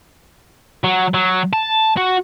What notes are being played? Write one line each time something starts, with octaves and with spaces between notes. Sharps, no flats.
F#3
F#3
A5
F#4